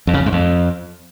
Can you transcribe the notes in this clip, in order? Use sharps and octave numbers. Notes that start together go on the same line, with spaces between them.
F2
C#3
F2
G#2
F2